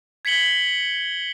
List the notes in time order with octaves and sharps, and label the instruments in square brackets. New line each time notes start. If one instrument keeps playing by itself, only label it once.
[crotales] G#6 B6 C#7 F#7 G7